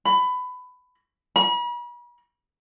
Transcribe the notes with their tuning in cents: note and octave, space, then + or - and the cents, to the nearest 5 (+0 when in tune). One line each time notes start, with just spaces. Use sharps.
B5 +20
B5 -40